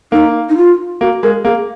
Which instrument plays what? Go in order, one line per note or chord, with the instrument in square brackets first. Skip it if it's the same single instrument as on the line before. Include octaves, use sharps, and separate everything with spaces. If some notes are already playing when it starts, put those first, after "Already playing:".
[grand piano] A#3 [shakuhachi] D#4
[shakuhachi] D#4
F4
[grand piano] A#3 [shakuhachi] F#4
[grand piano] G#3 [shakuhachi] A#4
[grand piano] A#3 [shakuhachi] G#4